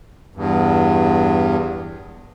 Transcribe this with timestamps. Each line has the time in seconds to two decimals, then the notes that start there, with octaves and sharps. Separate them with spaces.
0.36 E2 G2